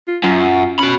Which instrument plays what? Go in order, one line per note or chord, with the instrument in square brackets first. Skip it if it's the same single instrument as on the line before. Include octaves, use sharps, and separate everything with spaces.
[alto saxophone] F4
[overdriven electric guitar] F#2 [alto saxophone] F4
[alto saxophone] C#4 [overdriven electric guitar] F#4 B5